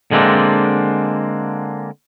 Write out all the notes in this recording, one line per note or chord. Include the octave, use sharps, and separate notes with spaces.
D3 G#3 A#3 C4 D4